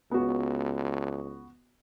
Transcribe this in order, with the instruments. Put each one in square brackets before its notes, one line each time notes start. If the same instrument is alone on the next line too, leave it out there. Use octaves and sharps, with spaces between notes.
[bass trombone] C#2 [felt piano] B3 F#4